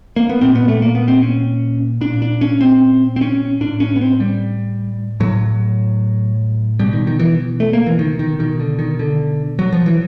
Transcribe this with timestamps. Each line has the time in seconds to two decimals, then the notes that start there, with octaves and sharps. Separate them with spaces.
0.16 A#3
0.29 B3
0.41 A#2 C4
0.55 B3
0.68 A3
0.82 A#3
0.95 B3
1.08 C4
1.22 C#4
2.01 A#2 D4
2.22 D4
2.41 C#4
2.61 C4
3.16 C4
3.21 C#4
3.61 A2 D4
3.80 C#4
3.96 B3
4.01 C4
4.20 G3
5.20 A2 F#3
6.79 B2 G3
6.93 D#3
7.07 D#3
7.19 E3
7.60 A3
7.73 A#3
7.86 E3
7.99 D#3
8.19 D#3
8.39 B2 D#3
8.60 D3
8.79 D#3
8.99 D3
9.59 F#3
9.73 F3
9.86 E3